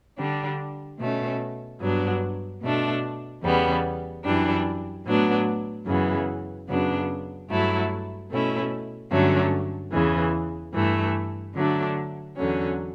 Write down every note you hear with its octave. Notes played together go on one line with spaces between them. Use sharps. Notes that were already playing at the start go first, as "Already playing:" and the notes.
D3 G3 D4
B2 A3 C#4
G2 F#3 B3 D4
B2 A3 D4
E2 C#3 G3 B3
F#2 E3 G3 D4
A2 F#3 B3 D4
F#2 C#3 E3 B3
F#2 C#3 F#3 B3 D4
G2 F#3 A3 E4
B2 A3 C#4 E4
G2 D3 F#3 A3 C#4
E2 C#3 E3
G2 E3 A3
D3 F#3 A3 D4
E2 D3 F#3 C#4